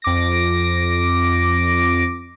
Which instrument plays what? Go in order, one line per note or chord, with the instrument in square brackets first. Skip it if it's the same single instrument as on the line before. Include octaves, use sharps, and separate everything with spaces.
[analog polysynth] F2 D6 A#6